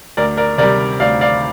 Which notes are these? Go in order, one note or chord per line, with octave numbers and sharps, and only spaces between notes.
D2 A#4 D5
A#4 D5
C3 G3 A#4 D5
D2 D5 F5
D5 F5